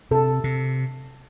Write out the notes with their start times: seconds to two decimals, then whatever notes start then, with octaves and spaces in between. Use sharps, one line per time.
0.11 C3 A4
0.44 C3